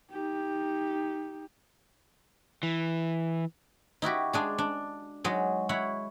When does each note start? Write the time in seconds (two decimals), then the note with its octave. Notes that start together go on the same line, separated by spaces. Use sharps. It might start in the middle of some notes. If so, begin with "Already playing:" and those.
0.11 D#4 G4
2.63 E3
4.02 D#4 E4 F#4 G4
4.33 G#3 D4 G#4
4.58 D4
5.24 F#3 G#3 D#4
5.69 E4 C#5 F#5